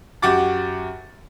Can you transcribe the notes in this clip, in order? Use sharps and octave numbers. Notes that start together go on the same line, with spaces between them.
F#2 F#4 G4 F#5 D6 A6